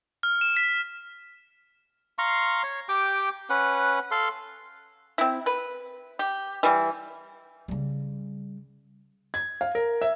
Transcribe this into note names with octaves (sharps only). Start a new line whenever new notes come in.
F6
E7
B6
F5 A#5 C6 C#6
C#5
G4 G5 D6
C#4 B4 F#5
A4 F5 C6
C4 E4
B4
G4
E3 G3
C#3 G3
G#6
F5
A#4
E5